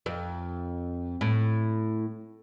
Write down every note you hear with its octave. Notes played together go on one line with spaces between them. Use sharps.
F2
A2